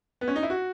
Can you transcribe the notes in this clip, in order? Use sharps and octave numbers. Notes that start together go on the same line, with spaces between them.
B3
C#4
D#4
E4
F#4